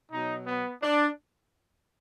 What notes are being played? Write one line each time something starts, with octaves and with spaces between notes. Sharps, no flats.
B2 F#3 D#4
B3
D4